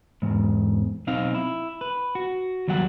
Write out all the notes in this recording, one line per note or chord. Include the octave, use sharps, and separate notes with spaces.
E2 G#2
B1 C4 D#4 F5
E4
B4
F#4
D#2 F#3 G3 F#5